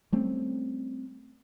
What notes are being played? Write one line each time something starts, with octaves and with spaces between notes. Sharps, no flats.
G3 A3 C4 C#4